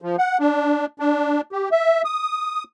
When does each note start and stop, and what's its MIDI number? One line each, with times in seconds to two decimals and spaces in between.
0.02 0.16 53
0.18 0.38 78
0.39 0.86 62
1.00 1.41 62
1.52 1.69 67
1.72 2.02 76
2.05 2.64 87